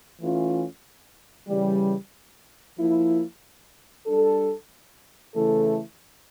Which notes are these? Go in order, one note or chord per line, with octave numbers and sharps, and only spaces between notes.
E3 A3 C#4 F4
C#3 E3 G3
F3 A#3 E4
G3 D4 A4
C#3 E3 A3 E4 A4